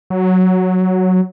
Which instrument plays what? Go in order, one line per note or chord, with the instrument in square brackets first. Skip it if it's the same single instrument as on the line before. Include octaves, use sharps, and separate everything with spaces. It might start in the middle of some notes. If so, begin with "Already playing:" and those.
[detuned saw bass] F#3